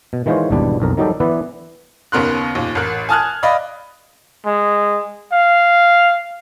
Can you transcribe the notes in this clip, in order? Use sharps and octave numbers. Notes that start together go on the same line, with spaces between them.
B2
D#3 E3 G#3 F4 C5 C#5
G#1 E2 B2 G3 D4
B1 F2 A#4
D#3 F#3 G3 D#4 G4 A4
E3 B3 B4 D5 E5
D#2 C#3 B3 A#4 C6 F#6
D#2 A#2
A1 A#4 F#6
G#5 A5 D#6 F6 F#6 G#6
D5 D#5 F5 B5 D#6
G#3
F5